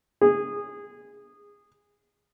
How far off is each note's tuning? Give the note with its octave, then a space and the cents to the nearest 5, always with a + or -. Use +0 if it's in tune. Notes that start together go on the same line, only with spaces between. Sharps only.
G#4 -20